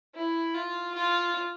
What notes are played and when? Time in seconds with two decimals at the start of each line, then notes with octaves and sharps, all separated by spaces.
0.15 E4
0.55 F4
0.94 F4